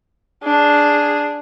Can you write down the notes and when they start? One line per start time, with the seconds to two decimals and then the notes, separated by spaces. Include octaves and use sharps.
0.43 D4 G#4